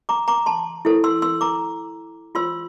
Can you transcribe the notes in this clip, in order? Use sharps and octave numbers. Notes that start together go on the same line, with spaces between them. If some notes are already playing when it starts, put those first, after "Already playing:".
A#5 D6
A#5 D6
A5 C6
E4 A4 C5
C6 E6
C6 E6
A#5 D6
F4 C5 C6 E6